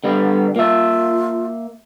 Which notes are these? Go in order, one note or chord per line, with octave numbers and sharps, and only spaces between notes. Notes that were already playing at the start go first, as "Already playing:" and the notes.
D3 G3 B3
A#3 F4 E5